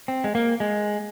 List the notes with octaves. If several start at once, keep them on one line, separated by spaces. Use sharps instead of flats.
C4
G#3
A#3
G#3